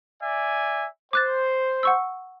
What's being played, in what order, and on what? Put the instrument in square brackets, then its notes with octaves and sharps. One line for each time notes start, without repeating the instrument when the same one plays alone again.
[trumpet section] D5 E5 G#5
[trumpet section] C5 [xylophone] D6 F#6 A6
[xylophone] F#5 C#6 E6